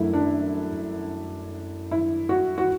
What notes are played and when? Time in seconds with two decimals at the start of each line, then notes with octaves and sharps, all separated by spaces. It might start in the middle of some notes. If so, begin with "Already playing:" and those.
Already playing: F#2 F#3 A3 D4 E4
0.13 D4
1.91 E4
2.29 F#4
2.58 F#4